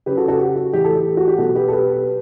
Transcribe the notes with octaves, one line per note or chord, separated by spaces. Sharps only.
C#3 F#3 C#4 G4 B4
F#4 A4
F#4 A4
G4
F#4
A2 E3 A3 G4
A4
G4
F#4
G4
B2 F#3 B3 F#4 A4
G4 B4
A4
G4 B4